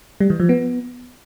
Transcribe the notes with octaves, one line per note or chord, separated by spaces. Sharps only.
G3
E3
F3
B3